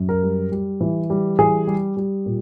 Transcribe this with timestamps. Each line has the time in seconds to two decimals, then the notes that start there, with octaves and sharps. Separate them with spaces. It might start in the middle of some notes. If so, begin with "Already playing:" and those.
Already playing: F#2
0.09 A#4
0.23 G3
0.52 G3
0.81 E3
1.10 G3
1.39 E3 G#4
1.67 G3
1.97 G3
2.26 A#2